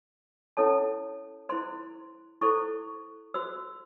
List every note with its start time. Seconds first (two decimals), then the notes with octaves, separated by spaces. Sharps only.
0.57 C#4 E4 A4 C#5 A5
1.49 E4 C5 C6
2.41 E4 A4 C5 C#6
3.34 F#4 C5 E6